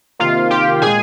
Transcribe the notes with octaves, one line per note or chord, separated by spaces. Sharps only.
C3 D#3 A#3 F4 F5
G4 G5
A#2 G#3 G#4 G#5